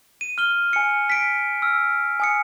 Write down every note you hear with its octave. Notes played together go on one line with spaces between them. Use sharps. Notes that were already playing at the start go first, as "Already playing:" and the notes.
D#7
F6 G7
G#5 C#7
B6 D7
E6 F6
G#5 D#6 C#7